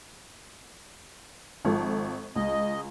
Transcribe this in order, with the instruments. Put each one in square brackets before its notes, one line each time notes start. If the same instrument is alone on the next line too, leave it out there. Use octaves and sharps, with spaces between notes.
[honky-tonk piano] G#1 F3 A4
[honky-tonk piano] C#2 [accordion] D#5